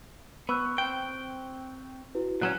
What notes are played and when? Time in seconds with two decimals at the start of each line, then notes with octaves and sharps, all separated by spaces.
0.49 B3 C#6 E6 F#6
0.78 C4 G5
2.15 E4 F#4 B4
2.41 A#2 F#3 C#4 F#6 E7